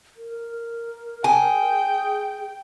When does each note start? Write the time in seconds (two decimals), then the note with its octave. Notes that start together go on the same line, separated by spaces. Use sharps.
0.16 A#4
1.24 G#4 G5